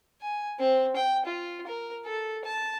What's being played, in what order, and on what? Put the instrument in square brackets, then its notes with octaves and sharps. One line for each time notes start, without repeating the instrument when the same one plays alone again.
[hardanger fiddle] G#5
C4
G5
F4
A#4
A4
A5